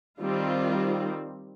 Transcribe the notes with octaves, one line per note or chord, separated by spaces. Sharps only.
D#3 G3 C4 F4